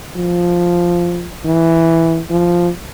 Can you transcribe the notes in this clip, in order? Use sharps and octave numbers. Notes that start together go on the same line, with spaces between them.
F3
E3
F3